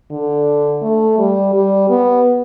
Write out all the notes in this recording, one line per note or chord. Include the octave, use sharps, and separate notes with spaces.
D3
A3
G3
G3
B3